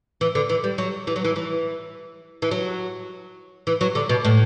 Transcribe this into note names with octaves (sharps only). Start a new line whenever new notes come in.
E3
D3
E3
G3
F#3
E3
F#3
E3
E3
E3
F#3
E3
F#3
D3
B2
A2